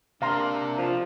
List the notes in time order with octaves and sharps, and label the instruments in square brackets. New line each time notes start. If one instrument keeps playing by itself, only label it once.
[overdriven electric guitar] C3 G4 [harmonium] A#3 D4 [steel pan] F5 A#5 C6
[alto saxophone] F3